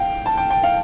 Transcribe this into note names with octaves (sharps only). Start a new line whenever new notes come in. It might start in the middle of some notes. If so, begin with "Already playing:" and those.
Already playing: F5 G5
A5
G5
G5
F5